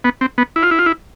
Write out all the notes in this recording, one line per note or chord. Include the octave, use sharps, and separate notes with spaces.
B3
C4
B3
E4
F4
E4
F4
E4